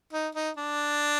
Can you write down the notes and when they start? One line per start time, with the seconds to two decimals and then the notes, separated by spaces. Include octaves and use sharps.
0.13 D#4
0.35 D#4
0.57 D4